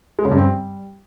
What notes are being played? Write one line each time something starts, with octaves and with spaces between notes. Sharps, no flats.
G#3
C#3
G2
C4
G3